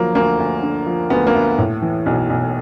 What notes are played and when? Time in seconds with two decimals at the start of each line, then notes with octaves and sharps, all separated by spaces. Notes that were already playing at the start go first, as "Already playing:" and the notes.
Already playing: D3 F3 F#3 A#3
0.15 D2 A#3
0.39 D2
0.63 D3
0.86 F3
1.10 D2 B3
1.27 A#3
1.35 D2
1.58 A2
1.82 E3
2.06 B1
2.30 B1